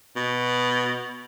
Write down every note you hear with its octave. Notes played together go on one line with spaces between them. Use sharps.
B2